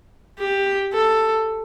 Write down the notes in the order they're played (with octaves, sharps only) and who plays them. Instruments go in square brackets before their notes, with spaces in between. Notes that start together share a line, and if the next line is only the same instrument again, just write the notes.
[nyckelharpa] G4
A4